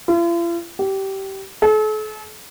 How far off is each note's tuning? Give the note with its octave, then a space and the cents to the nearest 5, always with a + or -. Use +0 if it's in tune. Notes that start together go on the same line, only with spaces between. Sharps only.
F4 -45
G4 -20
A4 -40